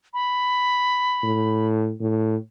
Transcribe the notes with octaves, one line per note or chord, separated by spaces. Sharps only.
B5
A2
A2